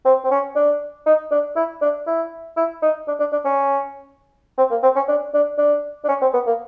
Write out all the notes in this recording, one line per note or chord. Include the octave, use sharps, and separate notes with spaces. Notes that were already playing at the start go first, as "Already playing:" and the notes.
C4
C4
C#4
D4
D#4
D4
E4
D4
E4
E4
D#4
D4
D4
D4
C#4
C4
A#3
C4
C#4
D4
D4
D4
D4
C#4
C4
B3
A#3